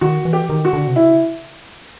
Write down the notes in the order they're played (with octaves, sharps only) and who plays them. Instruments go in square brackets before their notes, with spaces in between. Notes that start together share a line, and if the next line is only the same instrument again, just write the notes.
[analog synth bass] D#3 [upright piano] F#4
[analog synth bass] E3
[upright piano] G4
[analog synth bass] D#3
[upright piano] F#4
[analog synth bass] D3
C3
[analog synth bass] C#3 [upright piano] E4